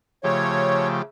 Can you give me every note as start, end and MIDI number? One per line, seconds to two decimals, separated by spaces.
0.24 1.01 49
0.24 1.02 53
0.24 1.01 57
0.24 1.02 67
0.24 0.88 73